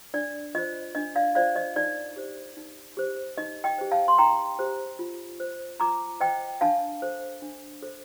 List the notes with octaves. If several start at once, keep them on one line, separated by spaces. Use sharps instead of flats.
D4 D5
F4 C5 D#5
D4 D#5
D5 F5
F4 C5 D5 F5
D#5
D#4 D5
G4 C5
D#4
G4 C5
D#4 D#5
D#5 G5
G4 C5
F5 A5
C6
D#4 G5 A#5
G4 C5
F4
C5
F4 A#5 D6
C5 D#5 G5
D4 F5 A5
A4 C5
D4
A4 C5